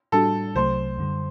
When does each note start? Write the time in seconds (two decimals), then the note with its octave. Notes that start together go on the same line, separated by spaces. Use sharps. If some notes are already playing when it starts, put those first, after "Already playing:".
0.12 A2 G3 D4 F#4 A4
0.55 C2 C3 F#3 A3 C5
0.98 F#2 D3 G3